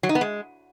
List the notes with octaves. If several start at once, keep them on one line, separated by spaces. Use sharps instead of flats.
F#3
D#4
B3
G#3